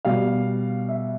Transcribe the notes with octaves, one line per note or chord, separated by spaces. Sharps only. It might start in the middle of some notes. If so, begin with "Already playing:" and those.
B2 G3 F5
E5